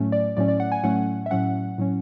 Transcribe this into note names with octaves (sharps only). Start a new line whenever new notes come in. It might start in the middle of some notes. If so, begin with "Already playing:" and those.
Already playing: A2 F#3 A3 C#4
D5
A2 F#3 A3 C#4 D5
D5
F#5
G#5
A2 F#3 A3 C#4 F#5
E5
A2 F#3 C#4 F#5
A2 F#3 C#4